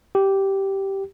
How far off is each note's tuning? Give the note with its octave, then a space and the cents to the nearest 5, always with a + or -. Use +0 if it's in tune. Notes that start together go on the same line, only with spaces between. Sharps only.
G4 -10